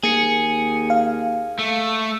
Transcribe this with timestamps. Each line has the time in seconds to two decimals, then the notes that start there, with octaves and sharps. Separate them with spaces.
0.03 D#2 A#3 G#4 C#7
0.90 F5
1.59 A3